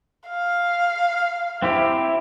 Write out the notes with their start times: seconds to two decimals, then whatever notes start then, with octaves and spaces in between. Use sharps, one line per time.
0.29 F5
1.62 C4 E4 G4